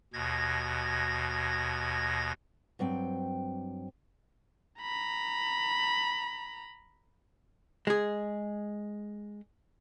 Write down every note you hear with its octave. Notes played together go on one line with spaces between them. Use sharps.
D#2 B2 G#6 A#6
G2 F#3 C4 G5
A#5 B5
G#3 G#4